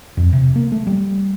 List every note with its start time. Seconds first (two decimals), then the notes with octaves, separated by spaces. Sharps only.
0.17 F2
0.33 C3
0.56 A#3
0.72 A3
0.87 G3